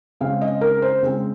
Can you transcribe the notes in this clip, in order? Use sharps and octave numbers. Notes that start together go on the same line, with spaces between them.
C#3 G#3 C4 F5
D#5
A#4
C5
C#3 G#3 C4